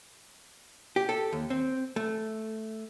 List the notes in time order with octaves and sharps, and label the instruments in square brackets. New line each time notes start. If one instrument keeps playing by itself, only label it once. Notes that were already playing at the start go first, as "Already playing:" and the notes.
[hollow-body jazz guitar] G4
A4
D#2
C4
A3